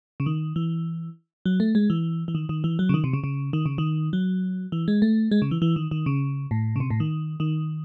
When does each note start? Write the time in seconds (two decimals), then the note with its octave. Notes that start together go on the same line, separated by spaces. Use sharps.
0.20 C#3
0.26 D#3
0.56 E3
1.45 F#3
1.60 A3
1.75 G#3
1.90 E3
2.28 E3
2.35 D#3
2.49 D#3
2.64 E3
2.79 F#3
2.89 C#3
2.94 D#3
3.04 C3
3.13 C#3
3.24 C#3
3.53 D#3
3.66 C#3
3.78 D#3
4.13 F#3
4.72 E3
4.88 G#3
5.02 A3
5.31 G#3
5.42 C#3
5.51 E3
5.62 E3
5.76 D#3
5.91 D#3
6.06 C#3
6.51 A2
6.76 C#3
6.80 C3
6.90 A2
7.00 D#3
7.40 D#3